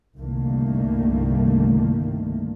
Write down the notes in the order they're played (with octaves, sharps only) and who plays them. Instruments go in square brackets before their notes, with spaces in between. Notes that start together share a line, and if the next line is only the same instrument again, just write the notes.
[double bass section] G1 C2 D3 D#3 A3 A#3